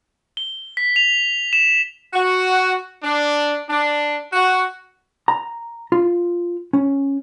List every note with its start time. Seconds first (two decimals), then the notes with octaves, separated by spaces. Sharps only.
0.37 G7
0.77 B6
0.96 F7
1.53 E7
2.14 F#4
3.03 D4
3.70 D4
4.33 F#4
5.28 A#5
5.92 F4
6.73 C#4